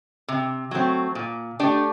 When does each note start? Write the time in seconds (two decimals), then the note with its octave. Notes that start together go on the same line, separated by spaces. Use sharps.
0.28 C3
0.71 F#3 A3 C4
1.15 A#2
1.59 A3 D4 G4 D5